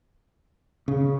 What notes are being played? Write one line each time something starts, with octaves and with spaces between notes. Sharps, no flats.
C#3